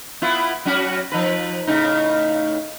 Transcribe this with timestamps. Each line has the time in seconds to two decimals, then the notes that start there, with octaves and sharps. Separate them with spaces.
0.22 B3 E4 F4
0.65 F#3 C#4 F#4
1.12 F3 D#4 B4
1.67 A2 C#3 D#4